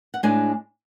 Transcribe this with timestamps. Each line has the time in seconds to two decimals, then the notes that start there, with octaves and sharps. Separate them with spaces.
0.14 F#5
0.23 A2 G#3 D4 G#5